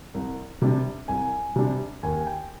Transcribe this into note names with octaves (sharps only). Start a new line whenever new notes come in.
C2
C3 G3 D4
C2 G#5
C3 G3 D4
D#2 G#5
G5